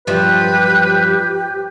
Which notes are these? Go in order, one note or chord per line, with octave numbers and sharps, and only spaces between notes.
G2 F3 F#3 G4 B4